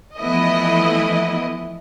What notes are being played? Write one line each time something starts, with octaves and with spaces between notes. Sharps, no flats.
E3 F3 A3 B3 E4 D#5